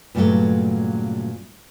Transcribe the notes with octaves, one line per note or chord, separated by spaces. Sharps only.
G2 A#2 C#3 F3 F#3 A3